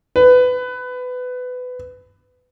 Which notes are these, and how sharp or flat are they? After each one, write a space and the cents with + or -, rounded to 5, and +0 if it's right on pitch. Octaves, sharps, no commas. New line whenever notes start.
B4 +20